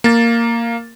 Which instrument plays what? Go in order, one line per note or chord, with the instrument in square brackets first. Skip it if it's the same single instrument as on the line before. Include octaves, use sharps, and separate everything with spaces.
[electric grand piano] A#3 A6